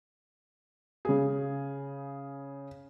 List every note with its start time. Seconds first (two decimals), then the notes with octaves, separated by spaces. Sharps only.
1.05 C#3 G#4